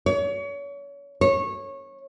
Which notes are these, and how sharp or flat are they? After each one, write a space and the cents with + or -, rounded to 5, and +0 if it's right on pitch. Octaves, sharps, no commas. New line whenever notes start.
C#5 +35
C#5 -20